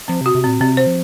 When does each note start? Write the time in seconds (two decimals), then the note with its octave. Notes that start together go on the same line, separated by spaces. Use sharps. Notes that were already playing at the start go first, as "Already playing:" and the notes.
0.08 F3 C4
0.21 C3
0.26 F#4
0.35 C3
0.44 A#2 C4
0.60 C3 C4
0.77 C5
0.87 F3